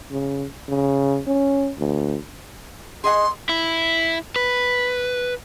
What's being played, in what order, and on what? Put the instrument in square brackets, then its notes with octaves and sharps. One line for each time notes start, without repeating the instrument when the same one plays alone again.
[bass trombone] C#3
C#3
C#4
D2
[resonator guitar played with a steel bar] G#4 D#5 F#5 [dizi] C6
[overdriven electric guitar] E4
B4